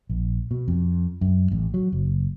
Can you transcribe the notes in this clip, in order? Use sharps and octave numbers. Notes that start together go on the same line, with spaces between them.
A#1
B2
F2
F#2
A1
F#3
F#1